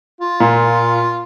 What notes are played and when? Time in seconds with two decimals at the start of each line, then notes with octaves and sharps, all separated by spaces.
0.21 F4
0.40 A#2